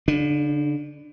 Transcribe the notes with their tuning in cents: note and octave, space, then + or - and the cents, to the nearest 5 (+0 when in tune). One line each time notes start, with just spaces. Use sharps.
D3 -40 D4 +25